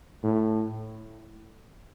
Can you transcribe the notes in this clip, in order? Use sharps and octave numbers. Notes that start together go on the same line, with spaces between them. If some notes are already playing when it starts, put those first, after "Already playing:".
A2